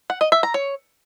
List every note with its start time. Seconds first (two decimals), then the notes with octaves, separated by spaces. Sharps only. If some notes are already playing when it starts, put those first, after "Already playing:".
0.10 F#5
0.21 D#5
0.32 E5
0.43 A#5
0.54 C#5